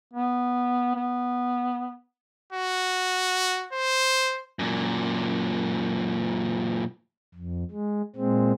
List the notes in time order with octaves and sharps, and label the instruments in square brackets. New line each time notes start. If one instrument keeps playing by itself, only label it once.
[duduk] B3
B3
[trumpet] F#4
C5
[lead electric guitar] F#2 A#2
[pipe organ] F2
G#3
A#2 G#3 C4